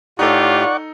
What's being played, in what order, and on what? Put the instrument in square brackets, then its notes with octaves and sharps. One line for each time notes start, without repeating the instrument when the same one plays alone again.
[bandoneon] A2 G4 [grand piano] D#4 A4 [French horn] F4 [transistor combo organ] D5 F#5 C#6